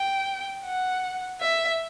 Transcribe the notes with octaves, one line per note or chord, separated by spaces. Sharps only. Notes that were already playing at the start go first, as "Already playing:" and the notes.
Already playing: G5
F#5
E5